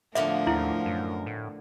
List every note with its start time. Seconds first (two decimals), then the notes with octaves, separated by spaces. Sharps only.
0.15 A2 D3 F3 A#3 B3 A#4 E5
0.47 D#2 E4
0.86 F#2
1.26 A2